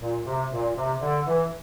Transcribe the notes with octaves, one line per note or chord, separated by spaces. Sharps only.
A#2
C3
A#2
C3
D3
E3